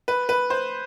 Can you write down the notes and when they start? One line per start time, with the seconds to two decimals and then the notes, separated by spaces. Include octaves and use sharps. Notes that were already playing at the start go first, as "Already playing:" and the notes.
0.08 B4
0.29 B4
0.50 C5